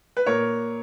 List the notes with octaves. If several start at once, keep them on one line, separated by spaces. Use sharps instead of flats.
B4
A#2 A#4 C#5